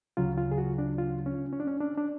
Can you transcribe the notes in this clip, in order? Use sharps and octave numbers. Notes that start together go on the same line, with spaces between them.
D2 C#3 F#3 F4
F4
G#4
F#4
D4
F4
C#4
C#4
D4
C#4
D4
D4